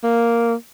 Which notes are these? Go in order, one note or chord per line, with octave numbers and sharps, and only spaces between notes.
A#3